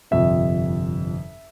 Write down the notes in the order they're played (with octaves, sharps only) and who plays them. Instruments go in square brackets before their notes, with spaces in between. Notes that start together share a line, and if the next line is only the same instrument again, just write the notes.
[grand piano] G1 F2 C3 E5